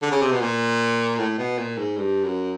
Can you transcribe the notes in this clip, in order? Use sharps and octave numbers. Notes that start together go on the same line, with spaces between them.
D3
C#3
C3
B2
A#2
A2
B2
A#2
G#2
G2
F#2